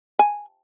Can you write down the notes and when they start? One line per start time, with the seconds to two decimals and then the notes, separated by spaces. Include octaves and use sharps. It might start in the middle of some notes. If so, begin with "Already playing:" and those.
0.19 G#5